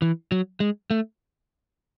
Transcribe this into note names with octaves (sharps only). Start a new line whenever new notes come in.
E3
F#3
G#3
A3